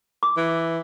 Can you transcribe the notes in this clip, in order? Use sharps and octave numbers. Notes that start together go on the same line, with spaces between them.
D6
E3